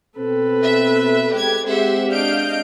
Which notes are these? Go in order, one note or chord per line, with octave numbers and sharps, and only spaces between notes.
B2 C4 A4 B4
E5
G#3 C4 G4 G#6
G#3 C4 G4 G#4 C5 E5 F#5
D4 D#5 F5 G6 D7